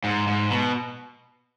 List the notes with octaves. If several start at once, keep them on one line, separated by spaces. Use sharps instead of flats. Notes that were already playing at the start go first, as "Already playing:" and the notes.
G#2
G#2
B2